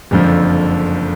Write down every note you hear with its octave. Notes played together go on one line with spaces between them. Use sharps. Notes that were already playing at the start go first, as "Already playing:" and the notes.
F#1 F2 D3 F3